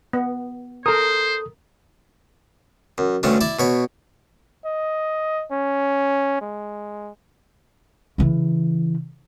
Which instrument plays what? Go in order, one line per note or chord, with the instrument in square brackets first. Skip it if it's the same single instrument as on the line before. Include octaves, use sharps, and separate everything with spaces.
[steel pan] B3
[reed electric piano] A4 D#6 [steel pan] A#4 [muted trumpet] C5
[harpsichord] F#2
D2 G2 A3 C#4 D4
E4 D5 E5
B2 C#5 B5
[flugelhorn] D#5
C#4
G#3
[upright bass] C#3 E3